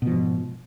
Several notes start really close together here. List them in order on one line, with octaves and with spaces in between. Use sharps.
B2 F3 G#2